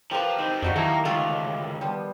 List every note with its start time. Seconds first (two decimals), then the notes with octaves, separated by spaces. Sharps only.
0.11 F3 F4 G4 A#4 B4
0.38 D#3 C4 D#4
0.62 F2 D4 D#4 F#4
0.76 D#3 F#3 A#3 E4 A4
1.05 C#2 D3 A3 F4
1.81 F3 G3 B3